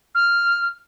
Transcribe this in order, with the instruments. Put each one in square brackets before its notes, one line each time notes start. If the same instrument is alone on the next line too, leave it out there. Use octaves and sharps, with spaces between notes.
[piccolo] F6